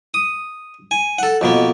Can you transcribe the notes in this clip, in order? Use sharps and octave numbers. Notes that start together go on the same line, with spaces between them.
D#6
G#5
A4 F#5
F2 B2 A#3